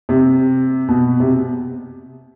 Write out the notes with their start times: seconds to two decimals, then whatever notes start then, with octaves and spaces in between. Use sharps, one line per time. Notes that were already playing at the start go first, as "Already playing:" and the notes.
0.09 C3
0.88 B2
1.20 C3